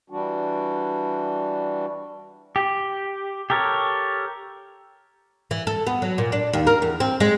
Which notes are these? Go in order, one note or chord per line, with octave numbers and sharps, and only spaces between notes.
E3 G3 D4 F#4
G4
G4 A4 A#4 C#5
E3
A4
B3
F#3
A#2
D4
D#2
A#4
E2
C4
G#3